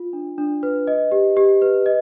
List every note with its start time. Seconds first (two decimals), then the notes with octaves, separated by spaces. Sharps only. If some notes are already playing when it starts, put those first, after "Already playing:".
Already playing: F4
0.13 D4
0.38 D4
0.63 B4
0.87 D#5
1.12 G4
1.37 G4
1.62 B4
1.86 D#5